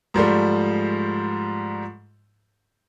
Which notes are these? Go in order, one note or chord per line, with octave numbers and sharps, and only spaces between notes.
G#2 F3 G3 A3